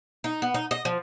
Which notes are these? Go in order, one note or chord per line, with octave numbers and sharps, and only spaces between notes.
D#4
B3
D#4
D#5
F3